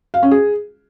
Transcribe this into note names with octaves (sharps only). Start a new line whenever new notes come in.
F5
C#4
G#4